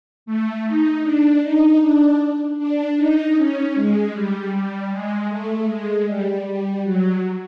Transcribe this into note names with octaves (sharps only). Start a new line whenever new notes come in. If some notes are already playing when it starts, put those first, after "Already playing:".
A3
D#4
D4
D#4
D4
D4
D#4
C#4
G#3
G3
G3
G#3
A3
G#3
G3
G3
F#3